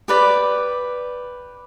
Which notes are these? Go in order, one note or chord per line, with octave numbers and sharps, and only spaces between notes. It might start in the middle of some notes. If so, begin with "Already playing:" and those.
G4 B4 D5